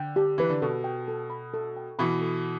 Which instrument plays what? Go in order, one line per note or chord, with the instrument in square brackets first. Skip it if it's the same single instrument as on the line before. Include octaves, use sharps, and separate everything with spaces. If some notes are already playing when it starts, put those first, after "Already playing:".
Already playing: [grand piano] D3 [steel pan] G5
[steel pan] G4
[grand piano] E3 [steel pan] B4
[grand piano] D3
[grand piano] B2 [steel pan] A4
[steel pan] G5
A4
B5
A4
G5
[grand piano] B2 E3 [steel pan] B5
[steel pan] A4